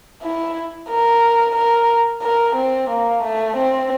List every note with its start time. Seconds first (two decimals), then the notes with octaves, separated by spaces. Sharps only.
0.23 E4
0.89 A#4
1.55 A#4
2.23 A#4
2.56 C4
2.90 A#3
3.23 A3
3.57 C4